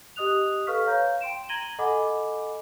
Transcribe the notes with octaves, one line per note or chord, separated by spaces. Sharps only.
G4 D#5 D#6 F#6 F7
A4 B4 F5 C#6 F6 B6
C#5 F5 A#5 G6
G5 C6 D7 E7
A#5 G#6 A#6 D#7 F#7 G7
A4 D#5 F#5 G#5 B5 D6